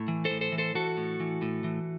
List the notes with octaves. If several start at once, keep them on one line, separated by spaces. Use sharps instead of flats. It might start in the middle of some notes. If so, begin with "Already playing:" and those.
Already playing: A2
E3
A4 C5
A2
A4 C5
E3
A4 C5
E3 F#4 A4
A2
E3
A2
E3